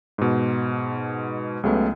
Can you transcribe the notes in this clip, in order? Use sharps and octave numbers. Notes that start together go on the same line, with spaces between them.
G#2 B2
C#2 C#3 F#3 A3 B3